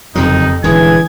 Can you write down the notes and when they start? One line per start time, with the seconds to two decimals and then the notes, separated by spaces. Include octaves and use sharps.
0.15 F#1 F2 C3 F3 D#4
0.64 D#1 D3 E3 G#3 G#4 G#6